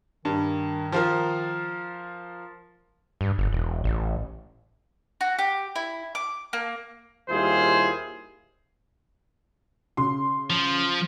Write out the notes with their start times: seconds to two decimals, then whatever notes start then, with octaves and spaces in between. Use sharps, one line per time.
0.25 G2 D#3
0.92 F3 F4 A#4
3.21 G2
3.38 G1
3.53 E1
3.84 A1
5.21 F#4
5.39 G4
5.76 E4
6.15 D6
6.53 A#3
7.29 D#2 G3 E4 F4 G#4 C5
9.97 C#3 C6
10.50 F3